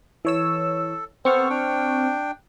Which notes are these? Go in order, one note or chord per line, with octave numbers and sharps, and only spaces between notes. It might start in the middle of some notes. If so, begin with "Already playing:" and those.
E3 A4 C#5 E6
B3 C4 A4 C5 C#6 F6
D4 G5